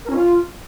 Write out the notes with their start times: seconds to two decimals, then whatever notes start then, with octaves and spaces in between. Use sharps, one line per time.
0.05 A#4
0.10 C#4
0.16 F4